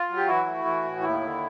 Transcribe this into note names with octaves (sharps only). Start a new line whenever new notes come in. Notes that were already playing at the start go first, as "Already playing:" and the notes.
Already playing: F4
F#3
G4
E3 E4 F#4
A3
E3
A2
D#2 E4
D3